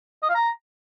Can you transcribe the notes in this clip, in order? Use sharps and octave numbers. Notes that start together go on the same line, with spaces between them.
D#5
F5
A#5